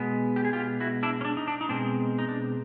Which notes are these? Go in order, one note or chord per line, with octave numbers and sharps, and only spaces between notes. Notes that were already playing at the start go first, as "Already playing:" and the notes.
Already playing: B2 G#3 B3
G4
G#4
F4 G4
E4 F#4
D4 E4
C#4
D4
D#4
D4
D#4
B2 G#3 C4 D4
D#4
D4